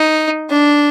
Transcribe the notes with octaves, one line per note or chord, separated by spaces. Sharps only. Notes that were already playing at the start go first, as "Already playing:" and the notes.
Already playing: D#4
D4